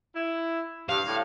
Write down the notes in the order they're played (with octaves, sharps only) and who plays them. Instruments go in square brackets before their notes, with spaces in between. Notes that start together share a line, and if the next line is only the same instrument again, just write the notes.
[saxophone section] E4
[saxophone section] G2 [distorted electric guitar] F5
[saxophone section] A2 D3